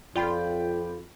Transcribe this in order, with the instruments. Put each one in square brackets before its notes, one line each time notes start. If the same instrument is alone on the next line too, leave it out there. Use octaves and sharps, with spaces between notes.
[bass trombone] F2 [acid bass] F4 [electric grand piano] D5 G5 B5